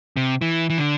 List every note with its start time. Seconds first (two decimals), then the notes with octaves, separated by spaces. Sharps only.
0.17 C3
0.42 E3
0.70 E3
0.78 D3